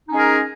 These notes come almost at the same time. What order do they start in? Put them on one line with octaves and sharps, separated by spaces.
D#4 C#4 G#3 G#4 A#4